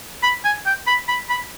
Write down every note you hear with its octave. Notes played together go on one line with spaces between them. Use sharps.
B5
G#5
G5
B5
B5
B5